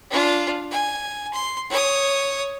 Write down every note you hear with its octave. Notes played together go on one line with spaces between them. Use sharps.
D4 F4
G#5
C6
C#5 D#6